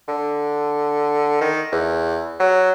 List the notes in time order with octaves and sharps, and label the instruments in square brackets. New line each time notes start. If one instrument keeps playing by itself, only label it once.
[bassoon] D3
D#3
E2
F#3